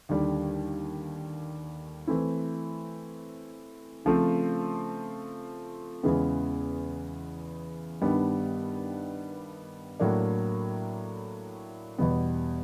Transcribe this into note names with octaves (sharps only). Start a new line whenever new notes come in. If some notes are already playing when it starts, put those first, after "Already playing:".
D#2 D3 G3
E3 A3 C4 E4
C#3 F3 A3 C4
E2 C#3 E3 G#3 B3
G2 D#3 G3 B3 D4
A2 F#3 A#3 D4
E2 B2 G3 B3